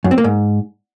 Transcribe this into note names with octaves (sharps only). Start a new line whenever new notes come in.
F#2
C4
A#3
G#2